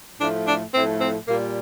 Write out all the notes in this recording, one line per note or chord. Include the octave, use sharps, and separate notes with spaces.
A2 F3 A3 D4
D4
A2 F3 A3 C4
C4
A#2 G3 A#3